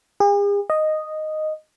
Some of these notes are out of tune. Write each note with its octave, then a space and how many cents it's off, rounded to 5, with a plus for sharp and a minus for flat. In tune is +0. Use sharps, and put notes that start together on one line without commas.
G#4 -45
D#5 -5